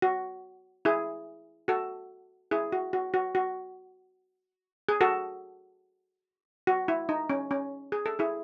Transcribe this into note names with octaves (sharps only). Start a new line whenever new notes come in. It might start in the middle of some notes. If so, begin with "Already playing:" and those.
F#4
E4 G#4
F#4 A4
E4 G#4
F#4
F#4
F#4
F#4
G#4
F#4 A4
F#4
E4
D#4
C#4
C#4
G#4
A4
E4 G#4